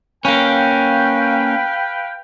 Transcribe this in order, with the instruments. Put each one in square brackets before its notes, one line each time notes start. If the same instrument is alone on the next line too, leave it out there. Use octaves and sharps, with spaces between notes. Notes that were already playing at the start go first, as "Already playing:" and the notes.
[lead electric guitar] A#3 C#4 [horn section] B4 F5 G5